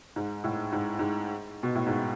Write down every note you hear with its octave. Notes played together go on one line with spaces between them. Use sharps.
G#2
A2
G#2
G#2
B2
A2
G#2